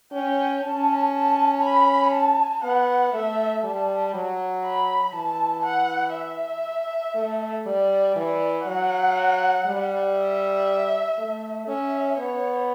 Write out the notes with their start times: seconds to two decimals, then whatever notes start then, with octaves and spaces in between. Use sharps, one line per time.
0.12 C#4 G5
0.63 C#4 A5
1.13 A5
1.63 B5
2.14 A5
2.64 B3 F#5
3.14 A3 E5
3.64 G3 A5
4.14 F#3
4.65 B5
5.14 E3 A5
5.65 F#5
6.16 E5
7.16 A3
7.66 G3 D5
8.16 E3 D5
8.67 F#3 F#5
9.67 G3
10.17 E5
11.18 A3
11.68 C#4 E5
12.18 B3 C#5